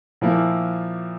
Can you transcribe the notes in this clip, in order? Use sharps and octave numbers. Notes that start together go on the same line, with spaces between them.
A#2 F3 A#3 E4